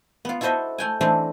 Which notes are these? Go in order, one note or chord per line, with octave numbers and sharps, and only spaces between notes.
B3 F4
E4 F#4 A4 C5 D#5 E5
A3 G5 G#5
E3 A3 C4 D4 D#4